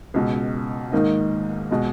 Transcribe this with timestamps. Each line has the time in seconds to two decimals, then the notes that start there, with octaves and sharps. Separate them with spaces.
0.14 C#2 B2 G#3
0.92 G#2 D#3 A#3 D#4
1.71 B2 G#3